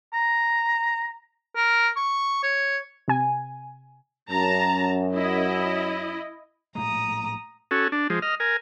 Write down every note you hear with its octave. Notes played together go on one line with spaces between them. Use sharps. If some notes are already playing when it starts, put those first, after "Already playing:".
A#5
A#4
C#6
C#5
C3 G#5
F#2 A5 A#5
E4 D#5
A#1 A2 G#3 A#5 D#6
C#4 F#4 A4
D4
F3 G#3
D#5 F6
A#4 G#5